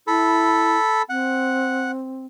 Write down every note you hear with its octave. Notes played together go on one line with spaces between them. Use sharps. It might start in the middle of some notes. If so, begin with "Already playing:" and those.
E4 A4 B5
C4 F#5